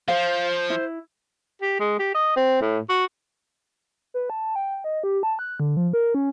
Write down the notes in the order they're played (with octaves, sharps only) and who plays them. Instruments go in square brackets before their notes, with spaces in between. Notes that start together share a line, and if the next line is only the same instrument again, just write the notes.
[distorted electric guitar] F3 [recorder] C5 [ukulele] F5
[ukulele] E4
[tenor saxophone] G4
G#3
G4
D#5
C4
A2
F#4
[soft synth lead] B4
A5
G5
D#5
G4
A5
F#6
D3
F3
A#4
C#4